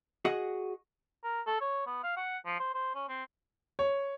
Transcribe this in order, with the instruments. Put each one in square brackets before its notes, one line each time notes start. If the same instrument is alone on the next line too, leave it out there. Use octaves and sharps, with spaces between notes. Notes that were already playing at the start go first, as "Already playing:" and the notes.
[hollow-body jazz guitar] F#4 G#4 D#5 F#5
[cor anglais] A#4
A4
C#5
B3
F5
F#5
F3
C5
C5
C#4
C4
[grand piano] C#5